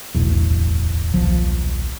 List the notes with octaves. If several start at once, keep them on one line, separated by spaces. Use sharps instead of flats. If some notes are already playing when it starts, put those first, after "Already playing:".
D1 B1 E2
D#1 B1 F3